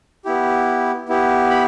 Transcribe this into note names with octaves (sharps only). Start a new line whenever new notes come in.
B3 E4 G4
B3 E4 G4
B5